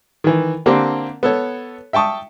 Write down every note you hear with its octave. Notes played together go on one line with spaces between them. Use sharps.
D#3 E3
D3 A#3 C4 D4 G4
B3 A4 C#5
E5 G5 A5 C#6 D#6